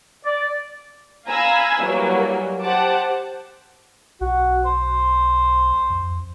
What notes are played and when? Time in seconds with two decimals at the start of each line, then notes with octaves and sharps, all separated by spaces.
0.24 D5
1.28 F5 G#5 A#5 B5 E6
1.82 E3 F#3 G3 A#3
2.62 G4 C5 F#5 A5 D6
4.21 B1 F#4
4.65 C5
5.90 F2